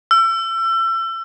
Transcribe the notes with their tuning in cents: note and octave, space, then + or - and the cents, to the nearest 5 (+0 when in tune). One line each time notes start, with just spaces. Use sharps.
E6 +30